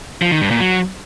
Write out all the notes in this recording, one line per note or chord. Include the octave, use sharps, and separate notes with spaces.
F3
D#3
G2
A#2
F#3